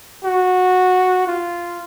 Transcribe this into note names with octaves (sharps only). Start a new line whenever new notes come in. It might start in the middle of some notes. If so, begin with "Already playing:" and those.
F#4
F4